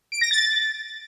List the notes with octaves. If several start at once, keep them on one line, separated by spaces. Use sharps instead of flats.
D7
A#6
A6